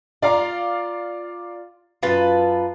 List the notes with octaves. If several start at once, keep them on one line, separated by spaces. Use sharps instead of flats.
F4 D5 F5 A#5
F#2 F4 B4 A5